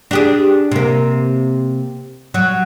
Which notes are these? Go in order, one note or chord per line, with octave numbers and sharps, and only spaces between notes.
D4 G4 G#4
C3 A#3
F#3